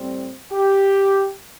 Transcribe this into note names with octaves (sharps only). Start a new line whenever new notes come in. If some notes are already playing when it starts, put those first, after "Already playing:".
Already playing: A2 G3 C4
G4